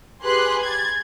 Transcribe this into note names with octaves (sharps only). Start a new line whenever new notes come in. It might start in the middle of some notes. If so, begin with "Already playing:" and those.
G4 G#4 B4 C6 F#6
G#6 A6